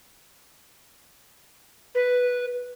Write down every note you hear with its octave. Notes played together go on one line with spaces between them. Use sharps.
B4